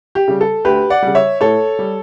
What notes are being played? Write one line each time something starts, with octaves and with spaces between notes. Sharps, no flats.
G4
C#3 G3
A4
D2 G4 B4
D5 F#5
C#3 G3
C#5 E5
A2 A4 C#5
G3